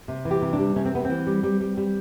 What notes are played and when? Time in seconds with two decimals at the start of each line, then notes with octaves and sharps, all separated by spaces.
0.08 C3
0.25 E3
0.31 G4
0.42 C3
0.53 D4
0.59 G3
0.76 C3 C#4
0.85 C4
0.93 G3 B3
1.05 E3 C4
1.26 G3
1.43 G3
1.61 G3
1.77 G3